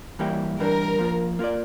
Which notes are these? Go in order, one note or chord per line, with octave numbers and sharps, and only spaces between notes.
E3 G3 A#3 E4 G4
E3 G3 D4 A#4
F3 A#3 F4
A#3 F4 A#4 D5